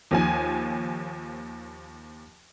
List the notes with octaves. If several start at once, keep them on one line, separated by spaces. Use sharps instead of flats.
D#2 F3 G#5